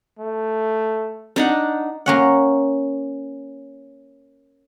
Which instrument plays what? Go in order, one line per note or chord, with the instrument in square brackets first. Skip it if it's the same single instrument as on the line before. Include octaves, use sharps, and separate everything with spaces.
[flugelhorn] A3
[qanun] D4 D#4 F#5
[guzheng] A#3 C#4 F#5